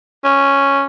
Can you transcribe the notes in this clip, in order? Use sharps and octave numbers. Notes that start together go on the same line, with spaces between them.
C#4